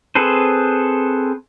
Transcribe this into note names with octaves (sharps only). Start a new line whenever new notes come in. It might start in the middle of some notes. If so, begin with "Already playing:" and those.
C4 G#4 A4 B4 C5